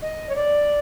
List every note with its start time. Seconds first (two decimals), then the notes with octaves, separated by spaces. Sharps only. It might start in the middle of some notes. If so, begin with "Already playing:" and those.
0.02 D#5
0.29 C#5
0.35 D5